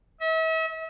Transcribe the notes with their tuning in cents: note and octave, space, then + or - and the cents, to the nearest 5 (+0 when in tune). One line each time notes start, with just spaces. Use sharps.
E5 -40